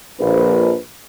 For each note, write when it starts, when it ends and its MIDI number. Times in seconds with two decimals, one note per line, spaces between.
0.20 0.72 34
0.20 0.78 71